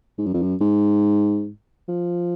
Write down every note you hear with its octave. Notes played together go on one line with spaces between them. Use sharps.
G#2
F#2
F2
F#2
G#2
F3